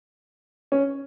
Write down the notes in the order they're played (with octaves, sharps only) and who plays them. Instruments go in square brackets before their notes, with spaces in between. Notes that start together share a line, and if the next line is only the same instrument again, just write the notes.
[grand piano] C#4